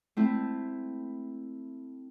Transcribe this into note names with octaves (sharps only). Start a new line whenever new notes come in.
A3 C4 E4